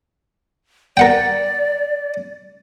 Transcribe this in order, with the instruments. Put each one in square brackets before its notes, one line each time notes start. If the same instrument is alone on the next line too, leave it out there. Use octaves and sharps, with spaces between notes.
[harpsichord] A#4 F#5 G5 [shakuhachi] D5